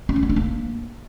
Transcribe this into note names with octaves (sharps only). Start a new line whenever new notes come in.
C#4
A#3
B3
D4
A#3